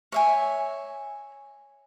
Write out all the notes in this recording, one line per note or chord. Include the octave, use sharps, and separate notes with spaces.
C#5 E5 G#5